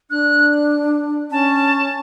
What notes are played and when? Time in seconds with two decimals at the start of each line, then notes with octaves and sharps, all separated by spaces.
0.10 D4 F#6
1.31 C#4 A5